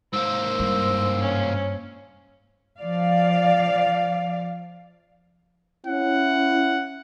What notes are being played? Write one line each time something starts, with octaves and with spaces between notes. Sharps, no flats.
G#2 A#3 C5 E6
G2
C#4
F3 D5 F5
C#4 E4 F#5